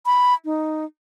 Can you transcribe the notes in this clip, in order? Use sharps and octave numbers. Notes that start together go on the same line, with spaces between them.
B5
D#4